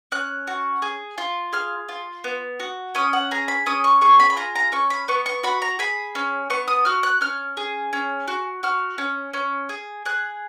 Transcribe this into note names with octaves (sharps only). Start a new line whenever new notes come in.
C#4 F#6
F#4
G#4
F4
G#4 F6
F4
B3
F#4
C#4 D#6
F#5
G#4 A#5
B5
C#4 D#6
C#6
G#4 C#6
B5
B5
F4 A#5
A#5
C#4 C#6
B5
B3 C#6
C#6
F#4 B5
A#5
G#4 B5
C#4
B3 C#6
D#6
F#4 F6
F#6
C#4 F6
G#4
C#4
F#4
F#4 F6
C#4
C#4
G#4
G#4 F#6